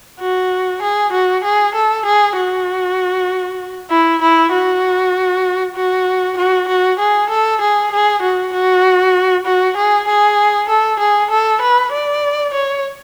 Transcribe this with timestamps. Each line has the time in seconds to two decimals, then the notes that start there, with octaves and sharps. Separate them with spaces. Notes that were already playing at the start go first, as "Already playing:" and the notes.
0.21 F#4
0.82 G#4
1.13 F#4
1.44 G#4
1.75 A4
2.05 G#4
2.36 F#4
3.90 E4
4.22 E4
4.52 F#4
5.76 F#4
6.37 F#4
6.68 F#4
6.99 G#4
7.30 A4
7.61 G#4
7.92 G#4
8.22 F#4
8.53 F#4
9.46 F#4
9.77 G#4
10.08 G#4
10.69 A4
10.99 G#4
11.31 A4
11.62 B4
11.92 D5
12.54 C#5